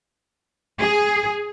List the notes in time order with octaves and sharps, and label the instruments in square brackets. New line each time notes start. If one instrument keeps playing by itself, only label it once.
[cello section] G#4